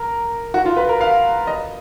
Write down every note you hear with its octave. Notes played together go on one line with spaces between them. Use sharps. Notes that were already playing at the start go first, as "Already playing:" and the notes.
Already playing: A#4
F#4
F4
B4
A#4
F5
D#5